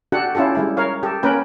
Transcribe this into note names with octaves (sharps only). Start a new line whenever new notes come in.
D4 F#4 G4 A4 F#5
C#4 E4 F4 G4 A4
G3 G#3 E4
A#4 C#5 F5
G4 A4
A#3 C#4 A#4 B4 G5